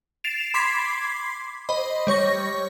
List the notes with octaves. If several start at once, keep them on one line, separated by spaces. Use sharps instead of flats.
A6 C7 D7 E7 F7
B5 C6 D6 G#6 B6 C7
C5 D#5 B5
G3 C#5 C#6 A#6